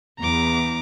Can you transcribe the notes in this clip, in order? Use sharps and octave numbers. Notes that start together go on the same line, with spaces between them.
E2 A#5 D6